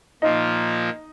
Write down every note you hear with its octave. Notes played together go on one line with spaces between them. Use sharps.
A#2 F3 A#3 D#4